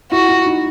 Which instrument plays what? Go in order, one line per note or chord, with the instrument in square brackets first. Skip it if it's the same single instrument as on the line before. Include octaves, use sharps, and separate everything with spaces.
[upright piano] E4 [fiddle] F#4
[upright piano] E4
D#4